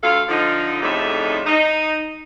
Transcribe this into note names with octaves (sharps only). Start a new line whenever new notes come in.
D2 F4 A4 F5
D3 F3 D#4
F2 A2 C#3 G3 D#4 E5
D#4